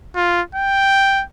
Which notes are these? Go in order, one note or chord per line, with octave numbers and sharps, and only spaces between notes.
F4
G5